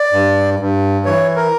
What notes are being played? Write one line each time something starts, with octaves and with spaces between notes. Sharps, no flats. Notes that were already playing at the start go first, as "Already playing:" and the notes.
Already playing: D5
G2
G2
E3 C#5
A#4